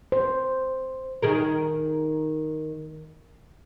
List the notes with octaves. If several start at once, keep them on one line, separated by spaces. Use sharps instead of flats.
C5
D#3 G#4 A#4